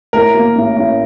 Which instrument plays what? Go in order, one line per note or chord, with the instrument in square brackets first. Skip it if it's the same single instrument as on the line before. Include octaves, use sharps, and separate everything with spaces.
[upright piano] A2 [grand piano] A#4
[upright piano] A#3
A1
A1